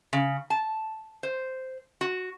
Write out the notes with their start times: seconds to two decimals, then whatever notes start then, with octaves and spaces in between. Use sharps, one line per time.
0.13 C#3
0.50 A5
1.23 C5
2.01 F#4